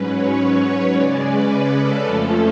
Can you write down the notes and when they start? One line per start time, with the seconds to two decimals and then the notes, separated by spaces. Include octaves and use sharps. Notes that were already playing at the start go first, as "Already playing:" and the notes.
Already playing: G#2 F#3 C#4 B4
0.09 C#5
0.38 C#5
0.66 C#5
0.95 C#3 G#3 C#4 D5
1.22 B4
1.51 B4
1.79 A4
2.07 F2 F3 A3 C#4